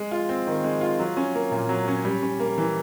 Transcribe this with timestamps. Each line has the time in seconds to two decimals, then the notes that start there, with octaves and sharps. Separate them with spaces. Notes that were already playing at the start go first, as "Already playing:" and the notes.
Already playing: G#3
0.11 F4
0.29 C4
0.47 D#3
0.64 G#3
0.81 F4
0.99 F#3
1.17 C#4
1.35 A#3
1.51 A#2
1.69 F#3
1.88 C#4
2.05 G3
2.22 C#4
2.40 A#3
2.58 E3